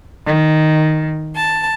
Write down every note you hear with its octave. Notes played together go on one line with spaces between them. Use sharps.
D#3
A5